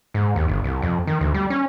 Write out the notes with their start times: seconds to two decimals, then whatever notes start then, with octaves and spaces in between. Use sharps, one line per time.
0.14 G#2
0.36 D#2
0.48 G1
0.64 C2
0.82 F2
1.07 D#3
1.21 D2
1.34 G3
1.50 C#4